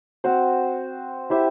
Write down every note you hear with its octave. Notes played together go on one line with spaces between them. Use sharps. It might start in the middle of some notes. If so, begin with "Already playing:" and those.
C4 F#4 C5
E4 G4 C5 E5